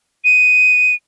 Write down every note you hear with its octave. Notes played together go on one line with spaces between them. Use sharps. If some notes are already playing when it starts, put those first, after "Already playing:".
D#7